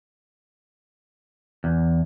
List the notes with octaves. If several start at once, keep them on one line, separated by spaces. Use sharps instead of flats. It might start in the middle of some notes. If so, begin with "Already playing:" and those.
E2